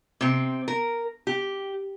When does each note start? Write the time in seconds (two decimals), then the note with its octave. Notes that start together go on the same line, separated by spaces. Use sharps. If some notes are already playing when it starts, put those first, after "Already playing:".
0.21 C3 C4
0.68 A#4
1.27 G4